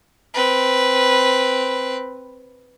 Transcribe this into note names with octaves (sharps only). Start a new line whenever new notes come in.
C4 B4